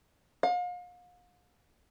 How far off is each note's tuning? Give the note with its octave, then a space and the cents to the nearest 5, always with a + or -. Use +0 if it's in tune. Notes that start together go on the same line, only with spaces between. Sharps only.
F5 +40